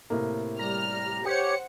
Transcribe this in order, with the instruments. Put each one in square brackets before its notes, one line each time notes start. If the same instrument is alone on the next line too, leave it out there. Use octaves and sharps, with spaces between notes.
[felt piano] A2 C3 A#3
[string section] G3 F6 [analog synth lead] A#5
[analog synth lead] G4 [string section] C5 F#5 C#7 [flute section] C#5